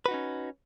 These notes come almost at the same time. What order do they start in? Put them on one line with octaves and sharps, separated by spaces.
B4 F#4 D#4 C#4